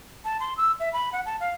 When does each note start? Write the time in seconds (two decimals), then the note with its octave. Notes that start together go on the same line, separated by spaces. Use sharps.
0.25 A5
0.40 C6
0.57 E6
0.80 E5
0.93 B5
1.13 F#5
1.26 A5
1.40 F5